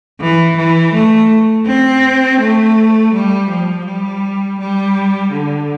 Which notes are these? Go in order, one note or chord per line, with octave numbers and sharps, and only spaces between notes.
E3
E3
A3
C4
A3
G3
F3
G3
G3
D3